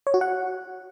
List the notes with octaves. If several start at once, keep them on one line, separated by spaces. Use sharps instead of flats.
C#5
F#4
F#5